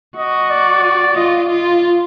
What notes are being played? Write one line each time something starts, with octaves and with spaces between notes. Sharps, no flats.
F#4 D#5
D5
D5
F4 D#5
F4